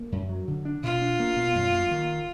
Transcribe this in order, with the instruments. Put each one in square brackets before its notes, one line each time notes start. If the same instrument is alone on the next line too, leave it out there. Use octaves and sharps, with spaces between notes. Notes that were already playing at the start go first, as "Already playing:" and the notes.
Already playing: [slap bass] A#3
F#2
F#3
D3
D4
[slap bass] B2 [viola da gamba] F4
[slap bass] D4
A#3
B2
F#2
A#3
D#3